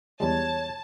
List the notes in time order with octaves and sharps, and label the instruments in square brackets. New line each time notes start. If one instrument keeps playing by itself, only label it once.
[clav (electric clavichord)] E2 G3 G#3 [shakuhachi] C#5 [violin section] A5